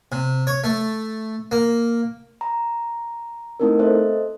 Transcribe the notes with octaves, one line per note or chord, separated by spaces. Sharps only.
C3
C#5
A3
A#3
A#5
A3 B3 C4 D#4 E4 A#4
A4 C5 D#5 E5